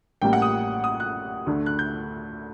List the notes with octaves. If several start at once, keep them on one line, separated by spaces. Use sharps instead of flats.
A1 A2 G3 A#3 G5
F#5
D#6
D#6
F#6
D2 D3 A3
F#6
G6